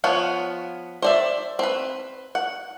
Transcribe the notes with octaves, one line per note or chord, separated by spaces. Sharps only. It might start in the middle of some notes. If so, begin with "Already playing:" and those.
F3 B3 C#5
C5 D5 E5
C4 B4
F#5